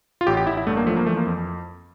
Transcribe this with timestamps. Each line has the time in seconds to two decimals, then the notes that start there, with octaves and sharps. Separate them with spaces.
0.21 F4
0.27 A1 G4
0.37 G4
0.47 A1 E4
0.57 E4
0.67 G2 A3
0.77 A#3
0.86 F3 A3
0.97 A#3
1.06 E3 A3
1.17 A#3
1.27 F2